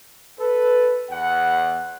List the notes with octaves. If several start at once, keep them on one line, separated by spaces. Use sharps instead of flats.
A4 B4
E2 F#5